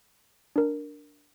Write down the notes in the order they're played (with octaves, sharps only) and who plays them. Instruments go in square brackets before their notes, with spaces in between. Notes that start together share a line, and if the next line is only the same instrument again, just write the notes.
[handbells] D4 A#4